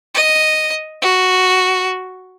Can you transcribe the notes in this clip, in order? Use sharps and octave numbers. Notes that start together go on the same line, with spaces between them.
D#5
F#4